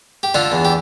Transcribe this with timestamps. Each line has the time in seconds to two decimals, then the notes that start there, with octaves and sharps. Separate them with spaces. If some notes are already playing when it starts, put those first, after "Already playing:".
0.23 G4
0.34 D3 D4 F4
0.52 E2
0.65 G4